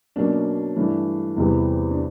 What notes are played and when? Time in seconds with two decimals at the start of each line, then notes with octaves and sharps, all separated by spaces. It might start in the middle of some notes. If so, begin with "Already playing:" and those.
0.16 B2 F#3 A#3 C#4 D4
0.76 G2 E3 A3 D4
1.37 E2 C3 E3 G3 B3
1.91 D4